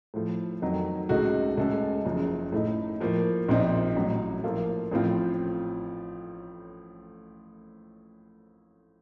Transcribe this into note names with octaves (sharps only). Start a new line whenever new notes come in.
A2 F3 A3
F2 D#3 F#3
C#2 C#3 A3 D#4 F#4
C#2 C#3 A3 C#4 A4
F#1 F#2 F3
A2 A3 D#4
A2 F3 A#3
A#1 A#2 F3 C4 D#4
A1 A2 F#3
A2 F3 A#3 F4 A4
A1 A2 F3 C4 F4